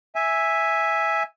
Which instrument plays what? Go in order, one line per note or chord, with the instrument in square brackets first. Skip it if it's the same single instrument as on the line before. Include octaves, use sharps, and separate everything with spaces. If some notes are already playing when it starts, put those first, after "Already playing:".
[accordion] E5 G#5